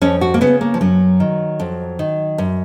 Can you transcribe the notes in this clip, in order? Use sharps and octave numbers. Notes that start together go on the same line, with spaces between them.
F2 C#4
F#4
A#3
C#3 B3
A#3
F3
F#2 F#3
D#3
F2
D#3
F#2